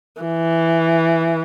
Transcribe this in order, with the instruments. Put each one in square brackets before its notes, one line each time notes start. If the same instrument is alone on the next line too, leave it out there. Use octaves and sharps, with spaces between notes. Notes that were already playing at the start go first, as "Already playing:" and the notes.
[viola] E3